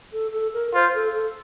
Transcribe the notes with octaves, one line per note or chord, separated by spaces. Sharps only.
A4
A4
A#4
F4 C5
A4
A4